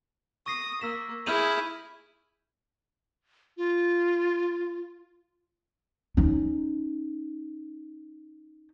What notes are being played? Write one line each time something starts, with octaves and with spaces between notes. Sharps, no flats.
C#6 D#6 A#6 C7
A#3 E6 B6 E7
E4 G#4 F6 G6 D#7
F4
C#4 D#4